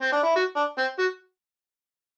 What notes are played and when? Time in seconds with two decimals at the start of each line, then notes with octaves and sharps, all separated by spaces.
0.01 C4
0.12 D4
0.24 E4
0.36 F#4
0.56 D4
0.78 C4
0.99 F#4